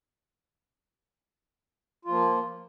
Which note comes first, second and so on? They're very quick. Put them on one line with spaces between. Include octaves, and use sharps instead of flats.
F4 F3 A#3